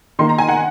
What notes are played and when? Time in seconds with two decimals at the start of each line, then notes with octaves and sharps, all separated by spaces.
0.19 D#3 A#3 C6
0.29 A#5
0.38 G#5
0.49 F#5